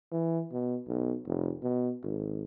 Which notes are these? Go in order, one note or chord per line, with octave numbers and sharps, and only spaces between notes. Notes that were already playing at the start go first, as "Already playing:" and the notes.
E3
B2
B1
F1
B2
G#1